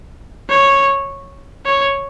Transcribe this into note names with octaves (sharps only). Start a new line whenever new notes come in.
C#5
C#5